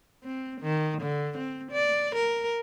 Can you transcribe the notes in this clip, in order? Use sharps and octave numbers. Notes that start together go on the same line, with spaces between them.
C4
D#3
D3
C4
D5
A#4